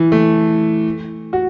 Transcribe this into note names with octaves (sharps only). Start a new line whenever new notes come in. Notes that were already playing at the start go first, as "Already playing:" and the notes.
Already playing: E3
A3
F#4